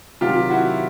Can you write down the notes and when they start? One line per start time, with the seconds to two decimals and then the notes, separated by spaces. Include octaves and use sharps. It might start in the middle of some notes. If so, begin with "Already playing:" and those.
0.21 C3 D#3 F#3 F4 G4
0.50 E4 F#4